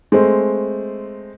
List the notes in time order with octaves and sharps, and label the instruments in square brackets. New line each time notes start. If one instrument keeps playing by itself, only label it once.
[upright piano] G#3 A3 C4